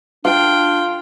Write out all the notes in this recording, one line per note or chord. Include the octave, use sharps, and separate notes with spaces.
D4 F4 F5 G5